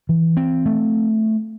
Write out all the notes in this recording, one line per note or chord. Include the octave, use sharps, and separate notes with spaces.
E3
C4
A3